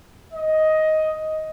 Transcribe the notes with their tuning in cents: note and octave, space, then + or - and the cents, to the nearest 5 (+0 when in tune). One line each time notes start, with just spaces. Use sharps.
D#5 +10